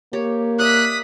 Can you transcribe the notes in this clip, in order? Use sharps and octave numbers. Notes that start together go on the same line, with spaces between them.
A#3 G4 C#5
D5 E5 D#6 F#6 B6